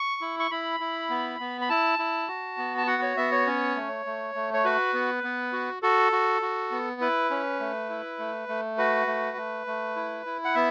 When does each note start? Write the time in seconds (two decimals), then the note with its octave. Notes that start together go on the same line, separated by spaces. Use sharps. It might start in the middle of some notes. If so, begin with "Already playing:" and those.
Already playing: C#6
0.21 E4
0.39 C#6
0.51 E4 B5
0.80 E4
1.10 B3
1.40 B3
1.61 B5
1.69 E4 A5
1.99 E4
2.28 F#4
2.58 B3
2.78 A5
2.87 F#4 F#5
3.02 C#5
3.17 B3 E5
3.32 C#5
3.46 C#4
3.76 A3
4.06 A3
4.35 A3
4.54 C#5
4.65 F#4 B4
4.94 B3
5.24 B3
5.53 F#4
5.82 F#4 A4
6.12 F#4
6.42 F#4
6.71 B3
7.01 E4 B4
7.30 C#4
7.60 A3
7.90 E4
8.19 A3
8.49 A3
8.78 F#4 B4
9.07 A3
9.37 A3
9.67 A3
9.96 E4
10.26 E4
10.45 F#5
10.55 B3 E5